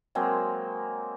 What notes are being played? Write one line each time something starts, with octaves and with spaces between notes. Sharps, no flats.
F#3 G#3 A#3 C4